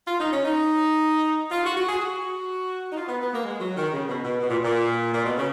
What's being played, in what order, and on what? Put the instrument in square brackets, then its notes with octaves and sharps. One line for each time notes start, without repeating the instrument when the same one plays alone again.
[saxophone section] F4
D#4
C#4
D#4
F4
F#4
F#4
G#4
F#4
D#4
F4
B3
B3
A#3
G#3
F#3
D#3
C#3
B2
B2
B2
A#2
A#2
A#2
B2
C#3